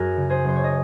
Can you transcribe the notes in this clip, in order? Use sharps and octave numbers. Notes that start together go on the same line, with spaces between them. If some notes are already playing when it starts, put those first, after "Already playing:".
Already playing: F#2 F#4 G#4 A#4
C#3
G#4 C5
F#1 C5
C#5
D#5